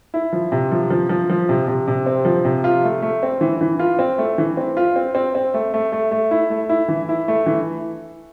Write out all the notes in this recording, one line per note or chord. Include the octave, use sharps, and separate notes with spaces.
E4
F3
C3
F3
F3
F3
F3
C3
C3
C3
C4
F3
C3
F4
A3
A3
C4
E3
E3
F4
C4
A3
E3
C4
F4
C4
C4
C4
A3
A3
A3
A3
E4
A3
E4
E3
E4
A3
E3